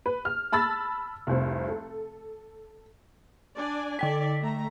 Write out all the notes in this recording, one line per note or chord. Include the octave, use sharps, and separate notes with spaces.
B4
F6
A5 B5 E6 A6
F1 C2 C4
A4
D4 D5 G#5
D3 A4 D5 G5 B6
A3 A#5